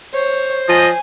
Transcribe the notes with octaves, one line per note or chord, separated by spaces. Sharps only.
C5 C#5
F3 D#5 G#5